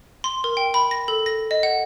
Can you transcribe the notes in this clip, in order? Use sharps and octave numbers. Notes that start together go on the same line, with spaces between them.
C6
A#4
G5
B5
A#6
A4
A#6
D#5
F#5